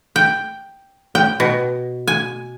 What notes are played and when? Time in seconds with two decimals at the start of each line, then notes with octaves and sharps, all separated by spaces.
0.16 G5
1.15 G5
1.40 B2
2.08 G#5